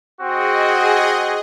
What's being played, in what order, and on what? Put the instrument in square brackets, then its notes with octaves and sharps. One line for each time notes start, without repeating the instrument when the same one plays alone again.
[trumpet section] C4 F#4 [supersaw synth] G#4 D#5